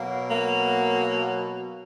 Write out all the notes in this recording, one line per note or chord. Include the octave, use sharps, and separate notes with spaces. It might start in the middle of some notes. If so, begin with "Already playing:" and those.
Already playing: B2 F#3 A#3
A#3